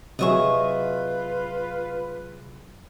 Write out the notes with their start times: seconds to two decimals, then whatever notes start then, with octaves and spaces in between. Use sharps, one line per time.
0.19 C3 F#3 F4 G#4 B4 D#5 E5 C#6